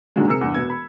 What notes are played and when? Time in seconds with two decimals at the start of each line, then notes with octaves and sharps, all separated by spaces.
0.16 E2 A#2 D3 D#3 F#3 G#3
0.28 C3 G#4 A#4 E6 C#7
0.41 E2 G2
0.54 E1 B3 G#6
0.70 B5